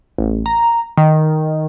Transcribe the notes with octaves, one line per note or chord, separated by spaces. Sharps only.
A1
A#5
D#3